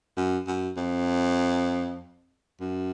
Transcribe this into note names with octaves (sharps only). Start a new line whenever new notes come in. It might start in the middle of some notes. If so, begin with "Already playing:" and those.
F#2
F#2
F2
F#2